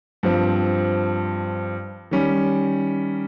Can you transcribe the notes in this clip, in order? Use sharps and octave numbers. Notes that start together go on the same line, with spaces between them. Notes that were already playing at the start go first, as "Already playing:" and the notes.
G2 F3 C4
D#3 G3 C#4